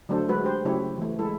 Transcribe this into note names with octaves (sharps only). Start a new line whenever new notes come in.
D3 F#3 A3 D4 A4 C5
F#3 G#3 F#4 B4 C5
G4 C5
C#3 F#3 A3 E4 G4 C#5
E3 A3
G#3 E4 A4